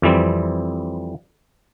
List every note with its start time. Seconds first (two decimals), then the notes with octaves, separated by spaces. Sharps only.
0.02 F2 E3 G3 C4